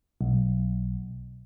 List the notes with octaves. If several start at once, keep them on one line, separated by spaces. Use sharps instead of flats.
B1